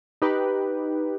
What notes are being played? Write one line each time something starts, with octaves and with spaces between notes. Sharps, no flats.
D#4 G4 B4